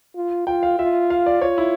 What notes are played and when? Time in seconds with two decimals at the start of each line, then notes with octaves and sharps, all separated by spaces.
0.16 F4
0.47 F4 G5
0.63 F5
0.79 F4 E5
1.10 F5
1.26 D5
1.41 F4 C#5
1.58 E4